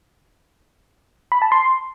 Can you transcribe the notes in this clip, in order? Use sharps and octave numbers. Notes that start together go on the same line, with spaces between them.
B5
A5
C6